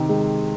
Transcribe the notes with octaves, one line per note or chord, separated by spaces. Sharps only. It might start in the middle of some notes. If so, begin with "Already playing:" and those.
Already playing: C3 D#3 C4
G#3